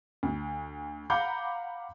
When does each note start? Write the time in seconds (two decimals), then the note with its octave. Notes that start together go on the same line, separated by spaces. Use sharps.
0.23 D2
1.10 F5 F#5 A#5 B5 D6 G6